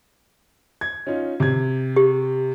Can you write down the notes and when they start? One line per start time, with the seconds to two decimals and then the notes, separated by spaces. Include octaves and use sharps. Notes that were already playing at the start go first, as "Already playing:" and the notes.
0.81 G#6
1.07 C#4 D#4 F4
1.40 C3 G#6
1.96 G4